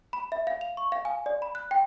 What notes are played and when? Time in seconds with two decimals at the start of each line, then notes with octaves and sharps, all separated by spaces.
0.13 B5
0.32 E5
0.47 F5
0.61 F7
0.77 C#6
0.92 F5
1.05 G#5
1.26 D5
1.42 B5
1.55 F#6
1.71 G5